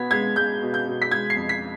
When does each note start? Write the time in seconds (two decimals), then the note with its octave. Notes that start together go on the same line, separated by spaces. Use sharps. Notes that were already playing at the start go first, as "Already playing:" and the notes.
Already playing: B2 B3 G#6 B6
0.11 G#3 G#6
0.36 G#3 G6
0.61 B2
0.74 G6
0.86 B2
1.02 B6
1.11 G#3 G#6
1.30 C7
1.36 F2
1.49 B6